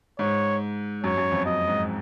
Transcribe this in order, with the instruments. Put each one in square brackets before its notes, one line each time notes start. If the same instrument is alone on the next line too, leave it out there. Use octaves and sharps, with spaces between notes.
[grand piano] G#2 [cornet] C#5
[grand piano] F#2 [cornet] C#5
[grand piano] F#2
F2
[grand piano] F#2 [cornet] D#5
[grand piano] G#2